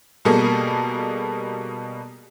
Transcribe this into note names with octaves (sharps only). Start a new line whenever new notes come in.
B2 G3 A#3 G#4 A4